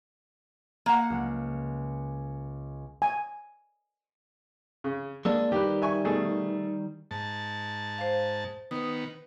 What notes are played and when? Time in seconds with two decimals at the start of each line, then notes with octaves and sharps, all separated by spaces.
0.86 A#3 F#5
1.10 C#2 G#3
3.02 G#5
4.84 C#3
5.25 G#3 A#3 D4 E6
5.52 D#3 G3 G4 B4
5.82 E5 G#5 C#6
6.04 B2 A3 G#4
7.11 G#2 A5
7.98 C5 F5
8.71 D#3 B3 B4 D#6